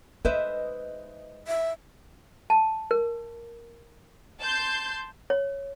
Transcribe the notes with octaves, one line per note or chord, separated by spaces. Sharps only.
G#3 D#4 B4 C5 D#5 E5
E5
A5
A#4
A5 C6 G6
C#5